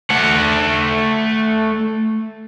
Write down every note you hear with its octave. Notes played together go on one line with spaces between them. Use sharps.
A3 F#5